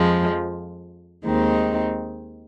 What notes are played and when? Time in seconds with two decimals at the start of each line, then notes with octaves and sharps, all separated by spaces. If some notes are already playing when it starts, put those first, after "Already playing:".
Already playing: F2 F3 G#3
1.24 D#2 D#3 G#3 C4 D#4